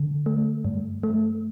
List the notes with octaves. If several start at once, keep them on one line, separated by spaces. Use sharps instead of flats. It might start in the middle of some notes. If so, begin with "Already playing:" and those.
Already playing: D3
A3
G2
A3